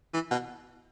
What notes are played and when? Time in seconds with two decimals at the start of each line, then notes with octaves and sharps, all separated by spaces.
0.14 E3
0.31 B2